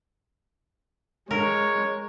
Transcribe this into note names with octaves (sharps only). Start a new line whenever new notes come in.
G#3 A#4 C#5